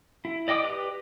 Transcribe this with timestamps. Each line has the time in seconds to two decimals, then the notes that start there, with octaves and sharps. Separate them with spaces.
0.25 E4
0.48 D5 D#5 G5 D6 D#6
0.64 G4 B4